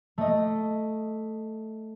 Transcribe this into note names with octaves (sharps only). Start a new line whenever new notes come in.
A3 D#5